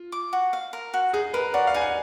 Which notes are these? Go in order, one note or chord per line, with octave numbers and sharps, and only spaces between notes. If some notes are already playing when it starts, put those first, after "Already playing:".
Already playing: F4
D6
F#4
F5
A#4
F#4
D#4 G#4
A#4 B4
F#4 D5
F5
D#4 G#5
F#5